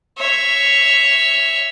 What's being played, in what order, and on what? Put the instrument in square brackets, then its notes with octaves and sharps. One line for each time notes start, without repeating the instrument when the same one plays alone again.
[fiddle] C#5 E5